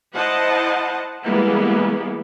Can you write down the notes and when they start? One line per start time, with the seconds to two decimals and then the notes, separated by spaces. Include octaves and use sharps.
0.16 E4 C5 D#5 F#5 A5
1.25 E3 G3 G#3 A#3 B3 E4